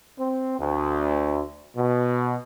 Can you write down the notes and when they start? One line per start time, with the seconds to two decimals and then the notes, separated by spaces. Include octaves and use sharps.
0.18 C4
0.59 D2
1.76 B2